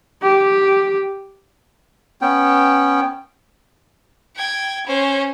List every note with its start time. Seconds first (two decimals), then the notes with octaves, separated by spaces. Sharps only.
0.22 G4
2.21 B3 C#4 G5
4.36 G5 G#6
4.86 C#4 C5